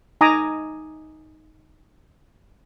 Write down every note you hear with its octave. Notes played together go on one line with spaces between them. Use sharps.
D#4 G#5 A#5 D6 D#6